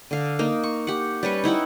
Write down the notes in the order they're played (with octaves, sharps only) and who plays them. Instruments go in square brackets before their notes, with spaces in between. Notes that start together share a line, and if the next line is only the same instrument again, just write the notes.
[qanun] D3 F5
A#3 D#4
C#6
G4 F#5
G3 C#4 B4 C#6
D#4 E4 F#5 G5